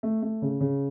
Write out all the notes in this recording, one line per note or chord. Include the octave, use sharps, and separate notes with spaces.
A3
A3
C#3
C#3